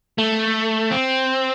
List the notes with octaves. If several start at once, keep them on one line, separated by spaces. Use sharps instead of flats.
A3
C4